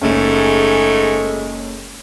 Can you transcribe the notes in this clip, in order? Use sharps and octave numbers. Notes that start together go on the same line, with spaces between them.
F#1 G#2 G#3 A3 C#4